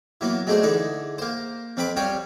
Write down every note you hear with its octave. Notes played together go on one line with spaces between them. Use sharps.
E3 F#3 A#3 B3
F#3 G#3 A3 D4 G#4 C5
D3 E3 D#4 G#4 A4
A#3 C5
F2 C4 B4 B5 D6
G3 C4 F4 G4 C#5